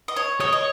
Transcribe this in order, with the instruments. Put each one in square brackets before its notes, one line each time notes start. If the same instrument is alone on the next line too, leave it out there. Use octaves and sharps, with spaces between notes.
[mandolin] D#5
C#5
[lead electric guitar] C#5 [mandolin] D#5
[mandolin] D#5